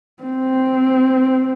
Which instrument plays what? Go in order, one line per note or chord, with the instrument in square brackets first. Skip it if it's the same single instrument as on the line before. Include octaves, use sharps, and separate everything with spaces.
[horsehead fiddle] C4